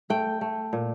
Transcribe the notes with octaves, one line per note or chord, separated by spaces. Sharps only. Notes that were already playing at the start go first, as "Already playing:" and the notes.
A3 G5
A3
A#2